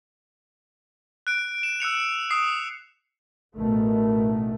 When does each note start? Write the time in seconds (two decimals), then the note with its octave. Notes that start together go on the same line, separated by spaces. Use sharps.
1.27 F#6 D7
1.63 E7
1.80 E6 F#6 C#7 F7
2.31 D#6 C7
3.57 A1 B2 D#3 A3